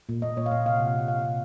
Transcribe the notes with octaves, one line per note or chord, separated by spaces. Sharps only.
A#2
A#2 D#5
A#2 C#5
F5
A#2 D#5
C3 F5
C3 F#5
F5
C3 F#5
C3 F5
F#5
C3